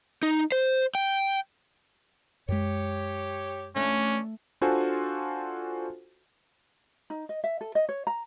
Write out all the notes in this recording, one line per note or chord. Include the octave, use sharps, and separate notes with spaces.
D#4
C5
G5
F#2 G#3 G4 C#5
E3 A3 C#4 D4
D4 F4 F#4 A4 C5 G#5
D#4
D#5
E5
A4
D#5
C#5
A#5